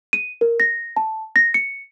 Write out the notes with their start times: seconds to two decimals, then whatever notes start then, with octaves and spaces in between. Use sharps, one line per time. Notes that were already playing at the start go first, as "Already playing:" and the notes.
0.13 D#7
0.41 A#4
0.60 A#6
0.96 A5
1.36 A#6
1.54 C#7